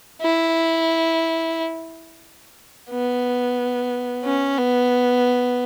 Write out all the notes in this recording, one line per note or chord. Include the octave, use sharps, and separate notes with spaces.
E4
B3
C#4
B3